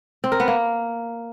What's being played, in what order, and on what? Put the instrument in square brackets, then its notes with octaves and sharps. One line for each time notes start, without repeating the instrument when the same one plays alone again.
[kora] C4
A#4
B3
A#3